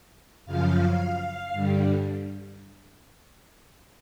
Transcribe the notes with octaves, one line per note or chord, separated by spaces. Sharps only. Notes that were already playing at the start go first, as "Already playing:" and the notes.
F#2 C#3 F3 F5
G2 D3 G3